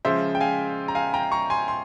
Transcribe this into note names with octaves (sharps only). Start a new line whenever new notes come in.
C#3 F3 G#3 C5 E5
G5
F5 G#5
A#5
F5 G#5
G5 A#5
A#5 C#6
G#5 C6
C6